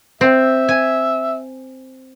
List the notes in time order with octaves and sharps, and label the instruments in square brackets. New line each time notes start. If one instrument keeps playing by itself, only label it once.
[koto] C4 [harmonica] E5
[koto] G#5